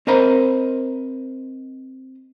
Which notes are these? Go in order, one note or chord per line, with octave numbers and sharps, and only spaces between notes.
C4 A#4 C5 D#5 A#5 B5